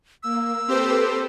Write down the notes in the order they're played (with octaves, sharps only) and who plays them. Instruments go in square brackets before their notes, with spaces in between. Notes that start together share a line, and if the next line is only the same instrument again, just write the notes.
[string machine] A#3 [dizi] E6
[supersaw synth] C4 G4 C5 [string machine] A4 B4